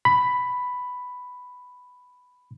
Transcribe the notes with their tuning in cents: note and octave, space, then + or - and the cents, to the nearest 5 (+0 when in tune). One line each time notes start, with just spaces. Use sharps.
B5 +5